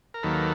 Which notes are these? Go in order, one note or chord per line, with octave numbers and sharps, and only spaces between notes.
A#4
D#2 D#3 F#3 A#3 A4 B4